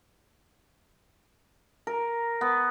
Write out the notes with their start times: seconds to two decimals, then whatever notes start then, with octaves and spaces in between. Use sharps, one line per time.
1.87 A#4
2.41 B3